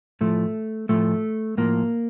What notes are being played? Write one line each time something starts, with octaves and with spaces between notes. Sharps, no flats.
A2 F3 A3
A2 F3 A3
A2 F3 A#3